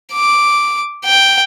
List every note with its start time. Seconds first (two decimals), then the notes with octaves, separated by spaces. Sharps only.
0.13 D6
1.05 G5